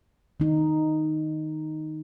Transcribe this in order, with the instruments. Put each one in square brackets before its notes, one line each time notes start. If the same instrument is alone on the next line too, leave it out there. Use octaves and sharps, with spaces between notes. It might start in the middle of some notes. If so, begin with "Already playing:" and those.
[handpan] D#3 D#4